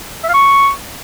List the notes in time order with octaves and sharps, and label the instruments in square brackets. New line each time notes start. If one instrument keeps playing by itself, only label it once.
[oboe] E5
F5
C#6